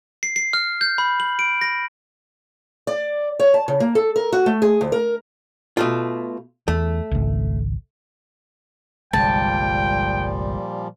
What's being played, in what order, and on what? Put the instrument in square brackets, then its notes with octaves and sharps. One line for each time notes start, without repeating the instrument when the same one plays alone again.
[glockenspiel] C7
C7
F6
G6
B5
F#7
D7
A#6
[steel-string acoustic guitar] D5
C#5
A5
C#3
A#3
A4
A#4
F#4
A3
G#4
D2
A#4
[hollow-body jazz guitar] B2 A3 F4
[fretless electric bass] E2 [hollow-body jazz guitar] A3
[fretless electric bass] G#1 C#2
[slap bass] G1 C2 G#3 [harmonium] A#2 F3 G3 [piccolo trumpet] G5 [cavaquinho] A5